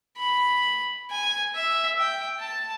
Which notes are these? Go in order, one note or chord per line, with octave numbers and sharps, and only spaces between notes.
B5
G#5
E5
G5
A5